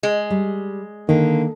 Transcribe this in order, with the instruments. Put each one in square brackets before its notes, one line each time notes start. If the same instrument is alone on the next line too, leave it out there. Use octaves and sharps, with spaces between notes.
[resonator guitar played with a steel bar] G#3
[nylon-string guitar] G3
[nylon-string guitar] D3 [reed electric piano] D#3 [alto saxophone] A#3